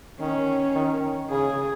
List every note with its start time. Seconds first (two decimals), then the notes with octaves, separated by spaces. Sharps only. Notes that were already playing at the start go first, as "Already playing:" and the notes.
0.19 D#3 C#4
0.76 D#3
1.31 C#3 G#4